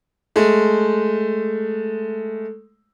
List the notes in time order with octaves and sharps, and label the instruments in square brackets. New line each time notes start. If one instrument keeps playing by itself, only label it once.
[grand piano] G#3 A3